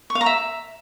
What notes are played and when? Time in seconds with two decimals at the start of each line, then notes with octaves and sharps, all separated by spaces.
0.10 C#6
0.15 F5
0.21 A#5
0.26 E5